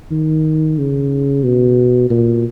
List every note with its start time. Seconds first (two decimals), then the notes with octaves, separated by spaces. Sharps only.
0.11 D#3
0.78 C#3
1.44 B2
2.10 A#2